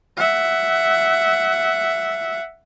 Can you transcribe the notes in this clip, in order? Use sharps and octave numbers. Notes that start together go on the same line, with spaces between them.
E5 F#5